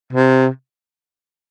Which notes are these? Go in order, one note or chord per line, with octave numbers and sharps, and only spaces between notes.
C3